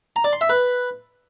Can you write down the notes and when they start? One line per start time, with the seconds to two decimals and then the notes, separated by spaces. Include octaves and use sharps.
0.16 A#5
0.24 D5
0.33 C6
0.41 E5
0.50 B4